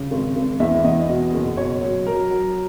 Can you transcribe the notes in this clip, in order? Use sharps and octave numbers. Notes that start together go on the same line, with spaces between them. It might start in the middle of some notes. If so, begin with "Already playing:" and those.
Already playing: C#3
G#1
G#1
E2 E5
E2 D#5
B2
F#1
B2 C#5
F#3
F#3 A#4
F#3